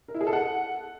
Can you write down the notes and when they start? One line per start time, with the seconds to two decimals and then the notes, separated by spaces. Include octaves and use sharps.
0.08 A#4
0.15 E4
0.21 G#4
0.27 A4
0.33 F#5